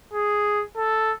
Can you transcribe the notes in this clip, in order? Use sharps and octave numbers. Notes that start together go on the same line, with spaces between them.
G#4
A4